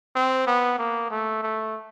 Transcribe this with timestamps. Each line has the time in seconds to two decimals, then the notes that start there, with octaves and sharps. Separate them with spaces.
0.16 C4
0.47 B3
0.79 A#3
1.11 A3
1.43 A3